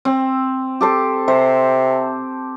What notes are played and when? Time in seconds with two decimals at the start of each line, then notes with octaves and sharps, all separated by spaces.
0.05 C4
0.81 G4 A4 C5
1.28 C3 C5